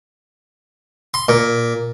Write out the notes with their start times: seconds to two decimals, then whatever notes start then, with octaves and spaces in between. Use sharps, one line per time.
1.14 C6
1.29 A#2